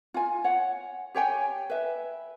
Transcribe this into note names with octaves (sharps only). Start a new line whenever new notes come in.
F4 G#5
C#5 F#5
G4 C#5 G5 G#5
B4 E5